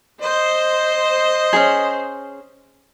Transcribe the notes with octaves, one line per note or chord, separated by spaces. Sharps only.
C5 D#5
C#4 D#4 G#4